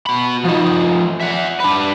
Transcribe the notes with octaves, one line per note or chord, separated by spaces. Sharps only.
F#4 B5
F3 D#4
E5 F#5
D4 B4